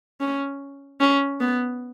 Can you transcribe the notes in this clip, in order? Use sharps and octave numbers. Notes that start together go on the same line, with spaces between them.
C#4
C#4
B3